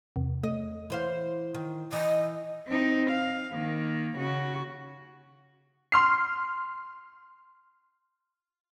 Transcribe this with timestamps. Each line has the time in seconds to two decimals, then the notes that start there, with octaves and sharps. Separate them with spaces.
0.16 E2 C3
0.44 A3 D#5
0.90 E3 C5 F5
1.54 D#3
1.93 E3 D#5
2.68 C4 D#4
3.11 F5
3.53 D#3 A#3
4.17 C#3 F#4
5.92 C6 F6 C7